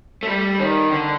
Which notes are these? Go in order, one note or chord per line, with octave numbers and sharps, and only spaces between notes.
A3
G3
D#3
D3